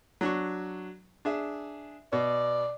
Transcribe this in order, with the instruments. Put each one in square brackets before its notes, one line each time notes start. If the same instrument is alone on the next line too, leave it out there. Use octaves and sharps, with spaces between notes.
[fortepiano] F#3 D4 C#6
D4 G#4 E5
[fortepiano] B2 [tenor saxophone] D5